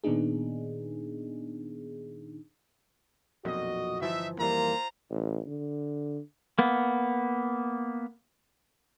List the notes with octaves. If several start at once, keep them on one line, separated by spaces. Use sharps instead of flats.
A#2 D#3 B3 D4 D#4 G#4
B1 F2 A#2 F#4 D#5
G1 E3 F3 D#4 E5
F2 E3 G3 A#3 F4 C5 A#5
A1
D3
A#3 B3